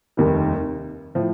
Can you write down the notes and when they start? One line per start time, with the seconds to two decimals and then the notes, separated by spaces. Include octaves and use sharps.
0.17 F1 D#2 D#3 G3
1.15 A2 F3